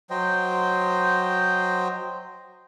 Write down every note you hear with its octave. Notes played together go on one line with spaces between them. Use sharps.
F#3 C5 D#5 G5